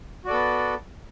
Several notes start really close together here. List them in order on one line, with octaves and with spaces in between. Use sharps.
F#4 D5 A4 B3